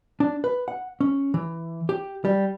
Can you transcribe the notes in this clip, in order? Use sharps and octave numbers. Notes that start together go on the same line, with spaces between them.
D4
B4
F#5
C#4
E3
G4
G3